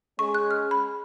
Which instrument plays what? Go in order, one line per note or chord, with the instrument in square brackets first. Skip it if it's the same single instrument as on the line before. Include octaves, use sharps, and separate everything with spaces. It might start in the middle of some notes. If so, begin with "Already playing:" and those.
[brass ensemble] G#3 C#4 G#4 [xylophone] C#6
[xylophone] F#6
F6
B5